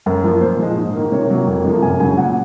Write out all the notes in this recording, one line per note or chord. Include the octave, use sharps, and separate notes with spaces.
F#2 A#4
F3 A#3
A#2 C5
F3 G#3
G#2
D#3 A#3
C3 C#5
F#3 A#3
F2
C3 F3 A#3
F#2 G#5
C#3 F#3 G#5
A#2 F#5